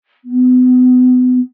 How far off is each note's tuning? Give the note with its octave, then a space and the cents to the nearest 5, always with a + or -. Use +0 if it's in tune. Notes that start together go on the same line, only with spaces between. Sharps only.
B3 +35